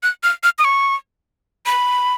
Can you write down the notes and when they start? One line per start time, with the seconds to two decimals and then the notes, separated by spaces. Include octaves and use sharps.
0.03 F#6
0.23 F6
0.43 F6
0.59 D#6
0.64 C#6
1.66 B5